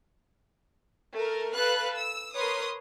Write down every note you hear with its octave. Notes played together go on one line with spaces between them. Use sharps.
A3 A#4
A4 B4 F5 F#6
E6
A#4 B4 C#5 C6 D#6